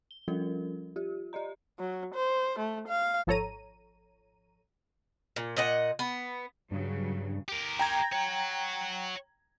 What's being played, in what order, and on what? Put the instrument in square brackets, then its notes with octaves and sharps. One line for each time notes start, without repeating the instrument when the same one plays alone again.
[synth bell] G7
F3 G3 C#4 F4 A4 A#4
F4 G4
G4 D5 D#5 A#5
[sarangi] F#3
C5
A3
F5
[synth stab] G#1 F3 A4 C#5 A#5 D#7
[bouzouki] A#2
A#2 D#5 F#5
B3
[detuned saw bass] G2 [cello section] C#3 F#3
[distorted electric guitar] G4 A#4
[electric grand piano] G5 A#5 G#6
[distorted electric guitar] C#5 F#5